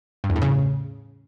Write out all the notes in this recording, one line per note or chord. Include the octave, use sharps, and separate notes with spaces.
G2
E2
A2
C#3